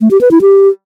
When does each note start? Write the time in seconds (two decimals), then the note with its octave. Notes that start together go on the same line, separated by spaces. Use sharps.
0.01 A3
0.11 G4
0.21 B4
0.31 E4
0.41 G4